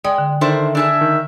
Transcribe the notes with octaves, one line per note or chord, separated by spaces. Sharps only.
G#3 D5 G5 D#6
D3
D#3 D4 E4 A4 C5
D4 G#4 E5 A5
D#3